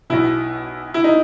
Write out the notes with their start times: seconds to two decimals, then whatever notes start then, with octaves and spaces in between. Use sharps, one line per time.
0.10 B1 B2 E4
0.94 E4
1.04 D#4